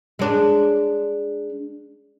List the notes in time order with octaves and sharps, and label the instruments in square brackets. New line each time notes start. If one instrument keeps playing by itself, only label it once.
[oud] G#3 D4